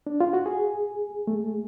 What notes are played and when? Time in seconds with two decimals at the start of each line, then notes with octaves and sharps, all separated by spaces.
0.07 D4
0.21 F4
0.33 F#4
0.46 G#4
1.27 A3